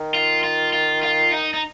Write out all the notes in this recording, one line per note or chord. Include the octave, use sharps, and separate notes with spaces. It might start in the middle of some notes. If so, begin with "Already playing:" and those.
Already playing: D#3
F4
F4
F4
F4
D#4
D#4